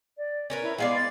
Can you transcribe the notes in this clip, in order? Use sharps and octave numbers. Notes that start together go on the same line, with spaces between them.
D5
C#4 A#4 B4
E4
G#3 B3 D5 F5
A6